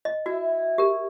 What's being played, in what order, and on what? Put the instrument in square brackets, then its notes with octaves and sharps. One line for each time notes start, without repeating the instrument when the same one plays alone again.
[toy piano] D#5
[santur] E4 E5 [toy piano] F#4
[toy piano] G4 A#4